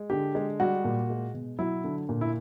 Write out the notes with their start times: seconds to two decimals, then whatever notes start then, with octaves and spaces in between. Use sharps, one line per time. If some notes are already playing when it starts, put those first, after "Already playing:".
Already playing: G#3
0.10 D3 G4
0.35 G#3
0.60 G3 F#4
0.84 A#2
1.10 G#3
1.34 B2
1.59 F#3 E4
1.84 D3
2.09 A#2
2.21 E4